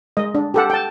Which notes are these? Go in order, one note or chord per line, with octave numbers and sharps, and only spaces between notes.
G#3 D#5
D4
G4 A4 F#5
G5 A5